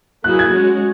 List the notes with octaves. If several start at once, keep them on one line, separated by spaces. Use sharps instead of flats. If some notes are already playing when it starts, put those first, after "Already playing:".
F#3 A#3 E4 G#4 F#6
G#6
G#3 C#4 F#4